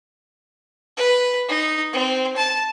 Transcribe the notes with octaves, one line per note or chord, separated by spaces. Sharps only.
B4
D#4
C4
A5